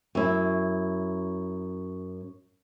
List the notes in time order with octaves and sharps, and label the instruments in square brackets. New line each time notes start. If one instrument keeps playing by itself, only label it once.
[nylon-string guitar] F#2 E4